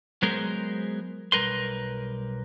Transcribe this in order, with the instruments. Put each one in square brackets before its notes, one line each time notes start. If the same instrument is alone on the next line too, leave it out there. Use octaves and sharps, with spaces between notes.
[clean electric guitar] F#3 G#3 B3 G#4 A#4 C5
B1 G3 A#4 B4 C6